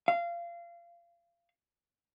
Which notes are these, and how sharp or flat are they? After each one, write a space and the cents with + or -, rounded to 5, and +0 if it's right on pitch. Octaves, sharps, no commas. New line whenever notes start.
F5 -25